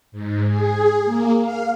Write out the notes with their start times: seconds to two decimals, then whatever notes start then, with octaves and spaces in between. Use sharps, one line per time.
0.12 G#2
0.47 G#4
1.05 A#3
1.41 F5